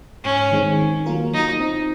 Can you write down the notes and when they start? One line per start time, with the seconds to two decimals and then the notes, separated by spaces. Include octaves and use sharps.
0.24 G#2 C#4
0.52 D#3 G#3 C4
0.79 D#3
1.06 F#3 A#3 F4 A#4
1.34 F#3 D#4
1.60 C4 D#4